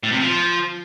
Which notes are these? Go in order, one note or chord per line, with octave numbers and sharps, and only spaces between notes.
A2
C3
F3